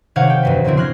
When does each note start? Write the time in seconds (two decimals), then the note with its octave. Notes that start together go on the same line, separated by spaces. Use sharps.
0.16 C3 D#3 C#5 F5 F#5 G#6
0.28 A4 G5
0.43 E1 F#2 B4
0.65 A#2 D3 F3 C4 E4
0.77 C6 F6 F#6 G#6 A#6